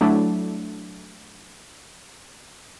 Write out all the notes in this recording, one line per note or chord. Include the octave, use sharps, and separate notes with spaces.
F#3 A3 D4 E4